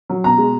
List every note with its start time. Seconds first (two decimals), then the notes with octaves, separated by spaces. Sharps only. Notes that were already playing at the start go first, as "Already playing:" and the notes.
0.10 F#3
0.24 B2 A#5
0.38 G#3